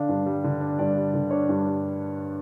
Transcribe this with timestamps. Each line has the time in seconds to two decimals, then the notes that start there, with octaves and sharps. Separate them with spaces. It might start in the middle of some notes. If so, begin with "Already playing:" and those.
Already playing: D3 D4 F5
0.09 G2
0.26 G3
0.44 D3
0.61 D4
0.79 G2 D5
0.96 G3
1.14 D3
1.31 D4 C#5
1.49 G2
1.66 G3